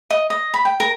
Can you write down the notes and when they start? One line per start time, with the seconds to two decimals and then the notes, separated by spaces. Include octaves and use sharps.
0.10 D#5
0.30 D#5
0.54 B5
0.65 G5
0.80 A#4